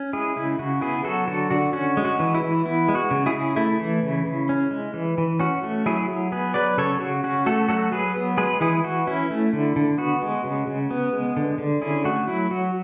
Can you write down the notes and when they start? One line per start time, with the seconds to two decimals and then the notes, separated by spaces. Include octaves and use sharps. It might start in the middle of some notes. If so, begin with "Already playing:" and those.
Already playing: C#4
0.13 G#3 E4 G#4
0.36 C#3 E4
0.59 C#3 F#4
0.81 B3 E4 G#4
1.04 F#3 F#4 A4
1.27 D3 F#4 A4
1.50 D3 F#4
1.73 C#4 F#4
1.97 G#3
2.05 F#4
2.20 E3
2.35 E4
2.42 E3
2.65 B3 E4
2.88 G#3
2.95 F#4
3.11 C#3
3.26 E4 G#4
3.34 C#3
3.56 A3 E4
3.80 E3
4.03 C#3
4.26 C#3
4.49 C#4
4.71 G#3
4.94 E3
5.18 E3
5.40 C#4 F#4
5.63 A3
5.86 F#3 E4 G#4
6.08 F#3
6.32 B3 G#4 B4
6.54 F#3 B4 D5
6.78 C#3 A4 C#5
7.00 C#3 F#4
7.24 C#4 F#4
7.46 A3 F#4 A4
7.68 F#3 F#4 A4
7.92 F#3 G#4 B4
8.16 B3
8.37 G#3 G#4 B4
8.61 E3 E4 G#4
8.84 E3 F#4
9.07 C#4 E4
9.30 A3
9.53 D3
9.76 D3
9.98 B3 F#4
10.22 G#3
10.44 C#3
10.67 C#3
10.91 B3
11.13 G#3
11.36 D3
11.58 D3
11.82 C#4 E4 G#4
12.04 A3 F#4
12.28 F#3 E4
12.51 F#3 F#4